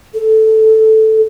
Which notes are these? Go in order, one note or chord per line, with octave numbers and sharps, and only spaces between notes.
A4